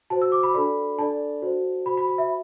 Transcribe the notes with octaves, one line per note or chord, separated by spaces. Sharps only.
F#4 C5 A5
E6
D6
B5
D4 A4 D5 B5
D4 A4 D5 A5
F#4 C5
F#4 C5 B5
B5
B5
E5